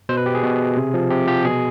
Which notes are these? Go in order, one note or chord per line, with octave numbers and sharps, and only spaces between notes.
B2 C5
B4
G4
G#4
B2
C3
F3
C3 G4
F3 G4
B2 G#4